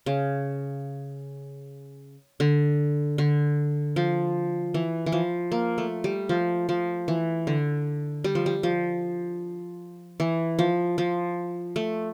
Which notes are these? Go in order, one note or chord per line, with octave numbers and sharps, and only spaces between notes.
C#3
D3
D3
F3
E3
E3
F3
A#3
A3
G3
F3
F3
E3
D3
G3
F3
G3
F3
E3
F3
F3
A3